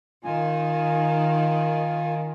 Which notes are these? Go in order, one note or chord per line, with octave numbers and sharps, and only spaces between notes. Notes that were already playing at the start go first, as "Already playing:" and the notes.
D#3 F4 G#5